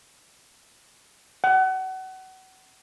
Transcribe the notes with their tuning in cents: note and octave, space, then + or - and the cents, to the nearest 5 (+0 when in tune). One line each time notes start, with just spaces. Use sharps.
F#5 +30